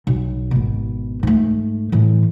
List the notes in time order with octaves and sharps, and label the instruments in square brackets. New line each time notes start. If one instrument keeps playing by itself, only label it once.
[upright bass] B1
G#1 B2
G#2 A3
A2 E3